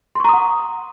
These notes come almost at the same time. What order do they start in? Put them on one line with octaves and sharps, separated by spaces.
C6 C#6 A#5 D#6 F#5